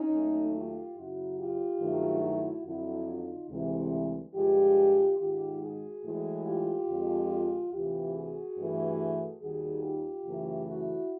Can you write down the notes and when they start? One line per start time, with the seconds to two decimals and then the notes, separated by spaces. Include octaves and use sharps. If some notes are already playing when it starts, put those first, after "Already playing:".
Already playing: C#4 D#4
0.11 D#2 D#3 F#3 A3
0.53 F4 G4
0.96 F#2 C#3 F#3 E4 F#4
1.39 F4 G4
1.80 G2 D#3 F#3 A3
2.22 E4 F#4
2.64 F2 D3 F#3 E4 F#4
3.07 D#4 F4
3.49 D2 C3 E3 G#3
4.34 G2 D3 F3 G#3 F4 G4
5.19 G#2 D#3 G#3 F4 G4
5.60 F#4 G#4
6.04 A2 E3 G#3
6.45 F4 G4
6.88 F2 D3 F3 G#3
7.72 D2 C3 E3 F4 G4
8.14 F#4 G#4
8.57 G2 E3 A3
9.41 D#2 D#3 G3 F#4 G#4
9.84 F4 G4
10.26 F#2 C#3 E3 A3
10.68 E4 F#4